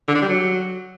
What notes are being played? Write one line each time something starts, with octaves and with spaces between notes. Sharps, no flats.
D3
D4
G3
F#3